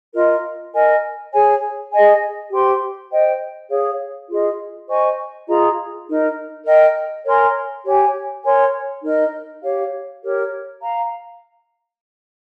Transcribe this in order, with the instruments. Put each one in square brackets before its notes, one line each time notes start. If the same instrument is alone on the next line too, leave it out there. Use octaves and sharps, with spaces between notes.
[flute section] F4 A#4 D#5
A#4 D#5 G#5
G#4 C#5 G#5
G#4 D#5 G#5
G4 C5 G5 C6
C5 D#5 G5
G#4 C#5 F5
F4 G#4 D#5
C5 D#5 G#5 C#6
F4 G#4 D#5 A#5
D#4 A#4 D#5
A#4 D#5 G5
A#4 C#5 G#5 C6
G4 C#5 G#5
A#4 C#5 G#5 C6
D#4 A#4 D#5
G4 C#5 F5
G4 A#4 C#5
F5 A#5